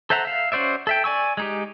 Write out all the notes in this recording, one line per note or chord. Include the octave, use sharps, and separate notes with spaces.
A4 C5 E5 F#5 A#5
E5 F5
C#4 F#4 C5 D5 E5
A4 E5 G5
D5 G#5 C#6 E6
G#3 D#4 G4